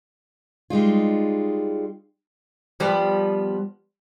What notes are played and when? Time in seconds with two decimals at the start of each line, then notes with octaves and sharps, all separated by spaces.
0.70 G3 G#3 D#4 F4
2.80 F3 G3 B3